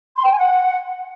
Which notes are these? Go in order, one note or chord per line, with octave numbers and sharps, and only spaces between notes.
C6
G5
G#5
F#5